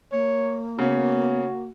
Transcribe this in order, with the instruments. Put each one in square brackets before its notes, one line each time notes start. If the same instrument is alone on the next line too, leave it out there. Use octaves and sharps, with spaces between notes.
[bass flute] A#3 [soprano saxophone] C#5
[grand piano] C#3 C#4 [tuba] B3 [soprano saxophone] F#4